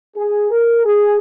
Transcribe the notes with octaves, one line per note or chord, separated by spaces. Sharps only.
G#4
A#4
G#4